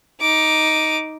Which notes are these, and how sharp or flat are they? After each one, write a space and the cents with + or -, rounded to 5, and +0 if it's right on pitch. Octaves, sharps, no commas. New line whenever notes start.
D#4 +10 D6 +0